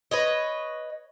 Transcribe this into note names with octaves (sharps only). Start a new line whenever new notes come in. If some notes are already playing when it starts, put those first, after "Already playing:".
B4 C#5 D#5